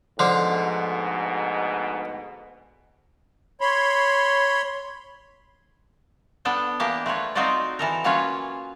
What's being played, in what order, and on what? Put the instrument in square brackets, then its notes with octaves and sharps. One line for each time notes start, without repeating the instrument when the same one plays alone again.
[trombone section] D2 G#2 B2 [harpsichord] D3 F3
[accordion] C#5 B5 C6
[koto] B3 D4 A4 G5
E3 A#3 D4 G4
A3 F4 B4 C#5
C4 D#4 F4 F#4 C5 D5
E3 A4 A#4
F#3 A#3 C#4 F4 B4 C#5